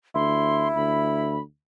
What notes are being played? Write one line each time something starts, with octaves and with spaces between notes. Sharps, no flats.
D2 E4 C6
D2 B5